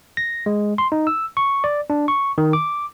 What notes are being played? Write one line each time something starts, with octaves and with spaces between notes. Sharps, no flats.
A#6
G#3
C6
D#4
E6
C#6
D5
D4
C#6
D#3
D6